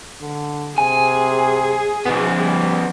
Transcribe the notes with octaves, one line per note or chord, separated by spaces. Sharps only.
D3
C3 G#4 G#5
B2 F3 B3
G3